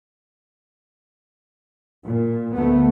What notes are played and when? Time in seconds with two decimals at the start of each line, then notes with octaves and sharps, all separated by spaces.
2.05 A#2
2.54 D2 A3 B3